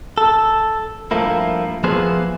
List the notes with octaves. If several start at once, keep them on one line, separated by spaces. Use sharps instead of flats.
A4
G2 F3 A3 A#3 E4
F3 A#3 B3 E4 G#4 C5